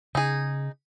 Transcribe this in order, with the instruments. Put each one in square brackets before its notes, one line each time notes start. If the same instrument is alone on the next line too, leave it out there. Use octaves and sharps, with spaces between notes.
[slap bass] C#3 [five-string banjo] D#4 G#4